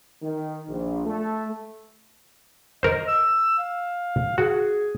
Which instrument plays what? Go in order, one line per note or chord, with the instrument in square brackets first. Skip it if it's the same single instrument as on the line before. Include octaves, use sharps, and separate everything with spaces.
[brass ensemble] D#3
A#1
A3
[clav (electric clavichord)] A#4 C5 [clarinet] D#5
[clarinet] E6
F5
[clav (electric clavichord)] F#4 [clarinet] G#4